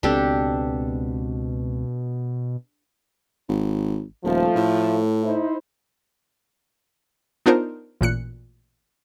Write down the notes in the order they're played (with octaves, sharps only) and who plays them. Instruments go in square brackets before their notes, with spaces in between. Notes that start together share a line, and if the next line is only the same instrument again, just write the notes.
[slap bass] C#2 C4 [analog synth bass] B2 [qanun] D4 G4 A4
[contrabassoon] G#1
[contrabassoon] D#1 [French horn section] F3 A3
[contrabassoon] A2
[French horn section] D#4 E4 C5
[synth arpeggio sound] B3 D4 D#4 F4 A#4 C5
A1 A#2 F#6 C#7